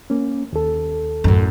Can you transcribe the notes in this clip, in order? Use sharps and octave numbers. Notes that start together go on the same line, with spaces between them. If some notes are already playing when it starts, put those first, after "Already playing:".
A#3 C#4
D#2 A4
F#2 A2